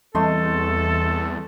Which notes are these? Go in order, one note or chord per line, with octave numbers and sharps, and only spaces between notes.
E2 E3 G3 A3 C4 A4 D#5 C6